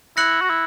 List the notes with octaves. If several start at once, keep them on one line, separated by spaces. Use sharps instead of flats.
E4 F#6 A#6 C#7 F#7
F#4
E4